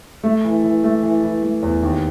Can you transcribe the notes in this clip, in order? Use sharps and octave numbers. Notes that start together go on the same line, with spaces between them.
A3
E3
E3
A3
E3
E3
A3
E2
D#2